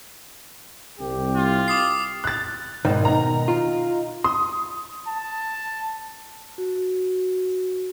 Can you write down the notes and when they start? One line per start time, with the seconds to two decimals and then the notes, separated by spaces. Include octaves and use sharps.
1.00 C2 G4
1.37 F4
1.68 D6 D#6 C7
2.24 F#6 A6
2.85 G#1 B2 D#3
3.05 D#4 A#5
3.48 F4
4.24 C6 D#6
5.07 A5
6.58 F#4